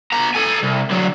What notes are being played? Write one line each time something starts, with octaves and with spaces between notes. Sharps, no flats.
B3 A#5
A4 G#5
C2
D3 F#3